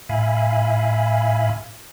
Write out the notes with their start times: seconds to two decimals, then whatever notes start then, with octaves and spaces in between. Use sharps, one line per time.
0.09 A2 E5 F5 G#5 B5